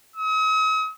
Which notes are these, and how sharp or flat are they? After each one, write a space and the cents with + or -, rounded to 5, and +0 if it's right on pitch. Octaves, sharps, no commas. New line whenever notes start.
D#6 +45